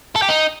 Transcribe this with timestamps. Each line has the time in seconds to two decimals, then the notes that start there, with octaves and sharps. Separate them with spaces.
0.16 A4
0.22 G4
0.29 D#4